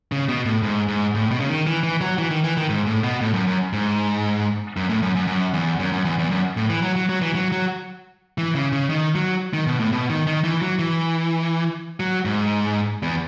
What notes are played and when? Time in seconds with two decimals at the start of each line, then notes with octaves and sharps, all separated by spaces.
0.12 C#3
0.29 B2
0.45 A2
0.63 G#2
0.88 G#2
1.15 A2
1.31 B2
1.40 C#3
1.49 D#3
1.67 E3
1.83 E3
2.01 F#3
2.18 E3
2.31 D#3
2.44 E3
2.57 D#3
2.69 G#2
2.87 A2
3.04 B2
3.21 A2
3.34 F#2
3.47 F#2
3.73 G#2
4.77 F#2
4.89 A2
5.03 F#2
5.15 F#2
5.27 F#2
5.54 E2
5.80 F#2
5.92 F#2
6.05 E2
6.19 E2
6.31 F#2
6.57 A2
6.70 E3
6.82 F#3
6.96 F#3
7.09 F#3
7.22 E3
7.35 F#3
7.52 F#3
8.38 E3
8.55 C#3
8.73 C#3
8.90 D#3
9.15 F#3
9.54 D#3
9.67 B2
9.80 A2
9.92 B2
10.10 D#3
10.27 D#3
10.44 E3
10.62 F#3
10.79 E3
12.00 F#3
12.25 G#2
13.03 E2